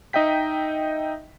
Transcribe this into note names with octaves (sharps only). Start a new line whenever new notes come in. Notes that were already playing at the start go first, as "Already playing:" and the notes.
D#4 D#5 E5 G5 B6